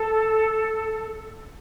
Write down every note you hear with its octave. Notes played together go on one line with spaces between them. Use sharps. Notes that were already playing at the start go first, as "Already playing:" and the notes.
Already playing: A4